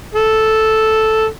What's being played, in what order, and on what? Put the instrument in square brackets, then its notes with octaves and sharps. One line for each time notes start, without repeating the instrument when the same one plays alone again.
[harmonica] A4